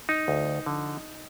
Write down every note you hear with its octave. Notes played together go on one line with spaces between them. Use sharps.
D#4
D2
D3 F3